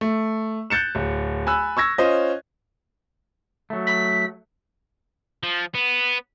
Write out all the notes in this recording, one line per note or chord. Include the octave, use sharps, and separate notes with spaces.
A3
F#6 G6 A6 C#7 E7
D1
G#5 B5 E6 F#6
C#6 E6 G#6 A#6
C#4 F4 C5 D#5
F#3 A3
B6
F3
B3